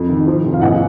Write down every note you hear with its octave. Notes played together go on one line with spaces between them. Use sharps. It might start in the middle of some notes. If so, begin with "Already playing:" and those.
Already playing: F2
D#3
F3
F1
F5
A#1 D#5 F#5